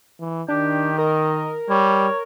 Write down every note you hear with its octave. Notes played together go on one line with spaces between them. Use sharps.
E3
D#3 D4 G4
A#4 D#5
G3 C#5